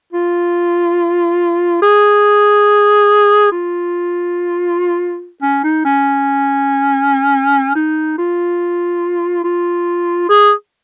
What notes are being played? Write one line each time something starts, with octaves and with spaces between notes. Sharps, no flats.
F4
G#4
F4
C#4
D#4
C#4
D#4
F4
F4
G#4